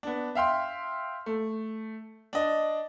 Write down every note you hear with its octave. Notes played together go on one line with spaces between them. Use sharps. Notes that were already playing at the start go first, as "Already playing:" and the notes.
B3 D4
E5 F5 G5 C6
A3
D4 D#5